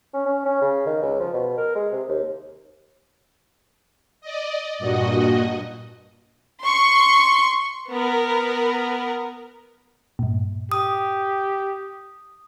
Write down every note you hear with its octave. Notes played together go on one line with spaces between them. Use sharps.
C#4
C#4
C#4
C#3
D#3
C#2
F3
B2
A#4
G#3
C3
D#2
D5 D#5
G2 A#2 F#4 D#5
C6 C#6
B3 A#4
G2 A#2
G4 D#6